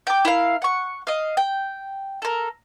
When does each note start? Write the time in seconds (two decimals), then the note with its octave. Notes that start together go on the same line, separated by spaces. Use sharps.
0.07 G5 D6
0.25 E4 A#4 F5
0.62 F#5 C#6
1.07 D#5 F5
1.37 G5
2.22 A4 A#4